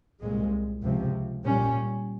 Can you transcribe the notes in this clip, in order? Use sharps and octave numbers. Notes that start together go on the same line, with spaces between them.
C2 A#2 G#3
C#2 C3 F3
A#2 G3 C#4